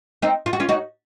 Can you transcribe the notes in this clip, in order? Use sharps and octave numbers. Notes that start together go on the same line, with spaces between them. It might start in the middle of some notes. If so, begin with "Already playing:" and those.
C4 D#4
F4
F#4
C#4 F4
D#4 F#4